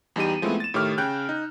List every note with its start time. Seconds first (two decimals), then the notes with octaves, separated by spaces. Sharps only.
0.16 E2 G3 D#4 G4 D#7
0.42 F3 G#3 A3 B3 C4 E4
0.60 A6 E7
0.74 A2 D#3 G4 C#5 D6 F6
0.98 C#3 G5 F#6 G6
1.29 D#4